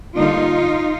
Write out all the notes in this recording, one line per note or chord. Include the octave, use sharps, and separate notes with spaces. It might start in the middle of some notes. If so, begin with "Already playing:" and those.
D3 G3 A#3 D#4 F4